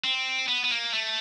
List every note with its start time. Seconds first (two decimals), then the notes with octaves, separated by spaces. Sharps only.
0.04 C4
0.48 B3
0.64 B3
0.71 A#3
0.93 A3